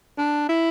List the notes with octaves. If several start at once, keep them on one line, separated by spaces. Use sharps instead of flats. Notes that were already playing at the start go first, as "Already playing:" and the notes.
D4
E4